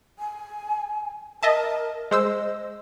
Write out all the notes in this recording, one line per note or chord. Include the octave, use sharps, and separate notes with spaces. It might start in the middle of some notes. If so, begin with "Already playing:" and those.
G#5
A#4 D#5 E5 A5
G#3 C5 D#5 E6